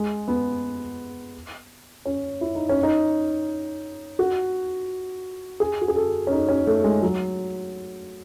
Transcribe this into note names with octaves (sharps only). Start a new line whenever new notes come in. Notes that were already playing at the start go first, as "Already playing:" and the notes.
Already playing: G#3
B3
C#4
E4
D#4
C#4
D#4
F#4
G#4
F#4
G#4
A4
C#4
D#4
C#4
A3
G#3
F#3